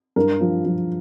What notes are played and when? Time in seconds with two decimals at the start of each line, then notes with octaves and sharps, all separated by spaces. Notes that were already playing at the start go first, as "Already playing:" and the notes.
0.16 G2 A#4
0.41 F3
0.65 F3